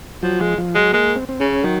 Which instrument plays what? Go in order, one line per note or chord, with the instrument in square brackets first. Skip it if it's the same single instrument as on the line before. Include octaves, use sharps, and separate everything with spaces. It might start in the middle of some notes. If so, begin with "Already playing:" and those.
[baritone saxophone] F3 [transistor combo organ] F#3
[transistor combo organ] F3 [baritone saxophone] G#3
[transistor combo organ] F3
[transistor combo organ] F#3 [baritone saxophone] G#3
[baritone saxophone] G#3 [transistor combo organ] A#3
[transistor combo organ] C4
C4
[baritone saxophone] C#3 [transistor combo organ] C#4
[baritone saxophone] D#3 [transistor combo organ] F#3